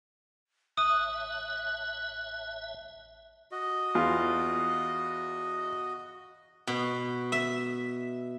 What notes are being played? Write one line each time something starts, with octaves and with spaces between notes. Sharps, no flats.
A1 E5 D#6 F#6 D#7
F#4 D#5
E2 F4
B2
E5